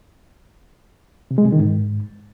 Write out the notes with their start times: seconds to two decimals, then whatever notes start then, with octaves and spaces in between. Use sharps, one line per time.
1.31 C3
1.38 G#3
1.45 C3
1.52 D#3
1.60 G#2